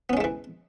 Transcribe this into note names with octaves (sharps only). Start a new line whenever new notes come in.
E3 G#3 A3 B3 C#4